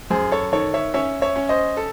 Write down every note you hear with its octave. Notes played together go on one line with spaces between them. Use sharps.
F#2 G#4 C5
A4 C#5
D#3 A4 C#5
C#5 E5
C#4 C#5 E5
C#5 E5
C#4
C5 D#5
A4